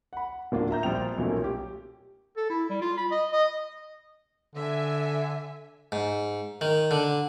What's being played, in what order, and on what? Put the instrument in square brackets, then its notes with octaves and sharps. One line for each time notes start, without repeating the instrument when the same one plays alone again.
[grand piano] F#5 B5
D1 A#3 D4 F4
E5 A#5 G6
A#1 G3 C4 G5 F7
B1 A#2 A3 C#4 A#4
G4
[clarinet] A4
E4
G3
F4
B5
D#5
D#5
[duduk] D3 [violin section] E5 G#5
[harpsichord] G#2
D#3
D3